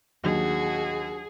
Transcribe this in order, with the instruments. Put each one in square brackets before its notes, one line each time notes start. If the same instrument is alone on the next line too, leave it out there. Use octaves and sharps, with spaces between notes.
[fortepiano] D#2 [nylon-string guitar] F#3 D4 [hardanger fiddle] F#4 [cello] G#4